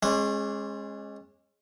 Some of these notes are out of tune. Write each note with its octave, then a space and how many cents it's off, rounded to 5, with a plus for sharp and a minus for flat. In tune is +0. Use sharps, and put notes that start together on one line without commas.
G#3 +0 C#4 -35 D5 -15